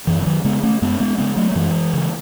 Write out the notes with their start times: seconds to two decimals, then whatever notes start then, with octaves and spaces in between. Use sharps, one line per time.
0.07 F#2 E3
0.22 E3
0.26 D#3 F#3
0.45 C#3 G#3 B3
0.63 A3 C#4
0.82 F#2 G#3 B3
1.00 G#3 B3
1.18 C#3 G#3 B3
1.37 F#3 A3
1.52 A3
1.55 F#2 E3 G#3
1.93 C#3